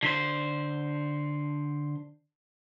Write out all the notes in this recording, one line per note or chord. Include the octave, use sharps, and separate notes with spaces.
D3 C5